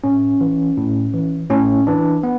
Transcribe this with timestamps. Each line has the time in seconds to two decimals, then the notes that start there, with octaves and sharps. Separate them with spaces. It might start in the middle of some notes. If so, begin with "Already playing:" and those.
0.04 A2 C#4
0.41 E3
0.77 A2
1.14 E3
1.50 A2 C#4
1.87 E3 D4
2.23 B3